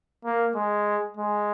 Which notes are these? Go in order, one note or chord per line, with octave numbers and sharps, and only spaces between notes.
A#3
G#3
G#3